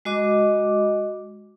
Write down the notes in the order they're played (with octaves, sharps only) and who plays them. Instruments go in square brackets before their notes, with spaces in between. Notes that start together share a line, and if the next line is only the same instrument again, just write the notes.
[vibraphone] G#3 F#4 D#5 D6